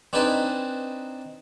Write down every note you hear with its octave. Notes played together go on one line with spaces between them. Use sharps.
C4 D4 D#4 B4 G#5 A5